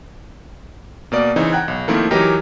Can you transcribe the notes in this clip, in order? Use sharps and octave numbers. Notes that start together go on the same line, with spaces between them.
B2 A#3 D5
C#3 E3 C4 D#4
F#5 G5 A#5 F#6 G#6
B1
D#3 F3 A3 A#3 C4 E4
E3 F#3 D#4 G4 A#4 D#5